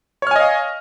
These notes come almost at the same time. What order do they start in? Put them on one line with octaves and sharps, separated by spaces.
C#5 F6 G#5 D#5 F5